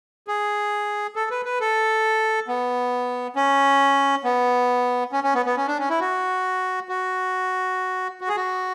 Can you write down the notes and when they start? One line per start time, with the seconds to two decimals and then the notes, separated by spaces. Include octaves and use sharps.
0.28 G#4
1.16 A4
1.31 B4
1.45 B4
1.60 A4
2.48 B3
3.36 C#4
4.24 B3
5.13 C#4
5.24 C#4
5.35 B3
5.46 B3
5.57 C#4
5.68 D4
5.79 C#4
5.90 E4
6.00 F#4
6.89 F#4
8.21 F#4
8.28 G#4
8.36 F#4